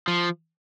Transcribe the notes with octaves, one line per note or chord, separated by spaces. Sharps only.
F3